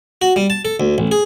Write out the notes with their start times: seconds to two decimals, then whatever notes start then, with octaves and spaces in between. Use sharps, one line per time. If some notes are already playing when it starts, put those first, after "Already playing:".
0.22 F#4
0.36 G3
0.50 A5
0.65 A4
0.80 D2
0.98 A1
1.11 G#4